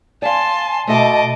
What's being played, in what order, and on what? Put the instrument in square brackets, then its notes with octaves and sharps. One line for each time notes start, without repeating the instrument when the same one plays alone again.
[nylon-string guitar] D5 F5 [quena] G#5 [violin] A5 C6
[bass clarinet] B2 [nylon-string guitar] A3 A4 E5 [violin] D#5 D6 [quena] A5